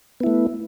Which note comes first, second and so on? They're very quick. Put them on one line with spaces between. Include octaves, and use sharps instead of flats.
B3 E4 A3